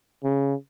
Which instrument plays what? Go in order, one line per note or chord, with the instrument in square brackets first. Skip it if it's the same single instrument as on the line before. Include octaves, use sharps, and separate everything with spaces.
[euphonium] C#3